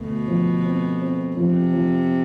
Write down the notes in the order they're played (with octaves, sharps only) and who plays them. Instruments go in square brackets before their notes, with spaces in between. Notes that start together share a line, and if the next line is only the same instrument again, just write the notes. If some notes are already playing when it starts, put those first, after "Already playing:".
Already playing: [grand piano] D2 [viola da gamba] B2
[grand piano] F3
C4
C4
[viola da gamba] C3 [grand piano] F3
[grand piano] F3